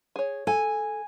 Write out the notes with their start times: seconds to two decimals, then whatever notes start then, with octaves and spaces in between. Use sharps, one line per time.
0.16 G#4 C#5
0.47 A4 G#5